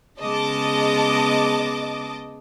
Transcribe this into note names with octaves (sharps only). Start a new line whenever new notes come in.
C#3 G#3 B3 D#5 A5 D6